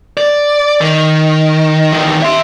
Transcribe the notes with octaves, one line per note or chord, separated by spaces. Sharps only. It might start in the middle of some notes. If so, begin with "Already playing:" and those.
D5
D#3
E2 D#3
E5 C6